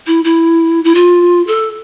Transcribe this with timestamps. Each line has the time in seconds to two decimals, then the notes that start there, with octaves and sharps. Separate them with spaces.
0.07 E4
0.24 E4
0.84 E4
0.95 F4
1.47 A4